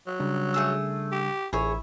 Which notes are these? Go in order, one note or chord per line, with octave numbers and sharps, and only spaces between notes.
F#3
C#3 G3 D4
A3 G#4 E6
G4
A1 E4 G#4 C#5